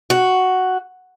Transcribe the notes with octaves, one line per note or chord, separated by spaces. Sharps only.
F#4